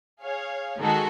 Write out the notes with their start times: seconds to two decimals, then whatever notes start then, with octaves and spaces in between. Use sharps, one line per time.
0.21 G#4 C#5 F5
0.78 D#3 G#3 D#4 F#4 G#4 A4